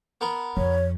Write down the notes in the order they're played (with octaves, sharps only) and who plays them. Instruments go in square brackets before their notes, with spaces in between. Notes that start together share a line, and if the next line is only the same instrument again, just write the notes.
[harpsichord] B3 A#4
[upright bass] F2 [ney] C#5